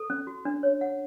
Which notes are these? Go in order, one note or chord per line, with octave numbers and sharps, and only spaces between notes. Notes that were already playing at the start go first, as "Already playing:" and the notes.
Already playing: A4
C#4
F#4
D4
C#5
F#5